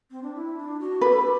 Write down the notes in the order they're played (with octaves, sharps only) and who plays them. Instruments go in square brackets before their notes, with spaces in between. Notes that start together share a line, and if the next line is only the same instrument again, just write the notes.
[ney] C4
D4
E4
D4
F#4
[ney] G4 [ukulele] B4
[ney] A4
G4